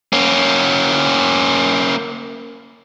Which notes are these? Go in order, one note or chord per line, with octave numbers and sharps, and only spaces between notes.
A#3 C#4